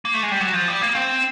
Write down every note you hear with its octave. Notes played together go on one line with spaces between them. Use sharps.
A#3
A3
G#3
G3
F#3
F3
G3
A#3
C4